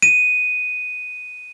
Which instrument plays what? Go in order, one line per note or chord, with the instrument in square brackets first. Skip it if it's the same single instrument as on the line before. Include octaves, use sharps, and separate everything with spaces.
[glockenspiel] D#7